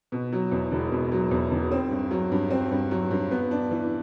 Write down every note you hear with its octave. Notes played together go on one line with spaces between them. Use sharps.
B2
F#3
E2
E1
B2
F#3
E2
E1
C4
G2
F#3
G2
C4
G2
F#3
G2
B3
D4
E3